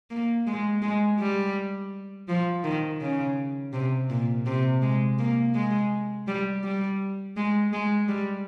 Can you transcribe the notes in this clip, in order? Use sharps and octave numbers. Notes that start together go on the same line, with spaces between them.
A#3
G#3
G#3
G3
F3
D#3
C#3
C3
A#2
C3
G#3
A#3
G#3
G3
G3
G#3
G#3
G3